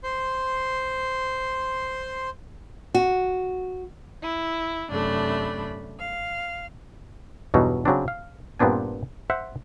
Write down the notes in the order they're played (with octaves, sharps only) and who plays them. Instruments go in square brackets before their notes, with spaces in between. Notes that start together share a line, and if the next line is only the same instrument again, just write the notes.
[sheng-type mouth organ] C5 C6
[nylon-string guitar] F#4
[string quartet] E4
F#2 C3 A3 D4 B5
F5
[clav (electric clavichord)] E2 G2 B2 F#3 D#4
C#3 F#3 C4 D4
F5
G2 A#2 B3 C4 D4 G#5
C5 E5 F#5